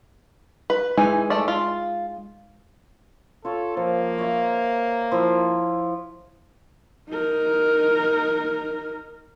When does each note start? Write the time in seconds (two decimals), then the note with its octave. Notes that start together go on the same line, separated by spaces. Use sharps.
0.70 B4
0.97 E3 G#3 D#4 G#5
1.30 A3 D5
1.48 F4
3.45 F4 A4 C#5
3.77 F3 A#3
4.18 C#5 E5
5.12 F3 E4 F4
7.09 D#4 A#4